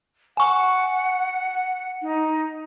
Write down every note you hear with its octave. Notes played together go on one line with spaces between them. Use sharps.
F#5 G#5 C#6
D#4